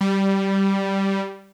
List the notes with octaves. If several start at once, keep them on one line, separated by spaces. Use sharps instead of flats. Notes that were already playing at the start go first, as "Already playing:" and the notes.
G3